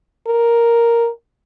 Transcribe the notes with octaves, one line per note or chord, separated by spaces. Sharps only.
A#4